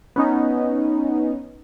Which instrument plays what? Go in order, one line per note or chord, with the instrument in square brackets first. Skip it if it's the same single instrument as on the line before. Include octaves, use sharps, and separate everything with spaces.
[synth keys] B3 C#4 D#4